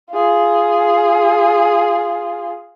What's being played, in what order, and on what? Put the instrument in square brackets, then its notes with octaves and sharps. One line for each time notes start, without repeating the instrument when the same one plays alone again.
[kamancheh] F4 G#4